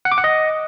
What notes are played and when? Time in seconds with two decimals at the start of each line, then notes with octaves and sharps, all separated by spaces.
0.05 F#5
0.12 D6
0.18 F#5
0.24 D#5